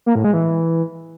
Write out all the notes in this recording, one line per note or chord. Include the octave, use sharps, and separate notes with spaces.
A#3
A2
G#3
E3